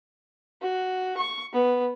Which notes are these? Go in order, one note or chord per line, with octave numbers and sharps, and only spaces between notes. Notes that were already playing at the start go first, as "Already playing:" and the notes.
F#4
C#6
B3